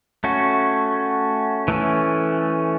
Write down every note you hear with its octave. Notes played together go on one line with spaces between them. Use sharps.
A3 C#4 F#4
E3 A3 C#4